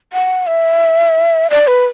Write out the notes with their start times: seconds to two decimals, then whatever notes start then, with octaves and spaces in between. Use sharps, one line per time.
0.13 F#5
0.47 E5
1.50 D5
1.67 B4